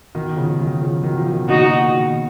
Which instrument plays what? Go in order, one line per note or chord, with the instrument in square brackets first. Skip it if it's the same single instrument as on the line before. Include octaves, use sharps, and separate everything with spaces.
[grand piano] B2 D#3
C#3 F3
F3
D#3 F#3
C#3 F3
B2 D#3
F3
B2 D#3
[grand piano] A#2 C#3 [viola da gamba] D#4 F#4
[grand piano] B2 D#3